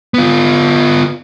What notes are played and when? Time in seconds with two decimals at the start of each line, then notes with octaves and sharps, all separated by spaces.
0.14 B3 F4